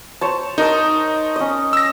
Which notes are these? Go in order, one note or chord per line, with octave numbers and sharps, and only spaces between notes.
C5 C#5 A5
D#4 A#4 D#5 A5
C#4 D#5
E6 A#6